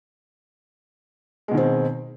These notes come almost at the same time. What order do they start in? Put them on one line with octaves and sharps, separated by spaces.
G#3 B2 D#3 C4